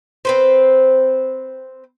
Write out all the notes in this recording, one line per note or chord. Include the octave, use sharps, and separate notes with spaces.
C4 B4 C5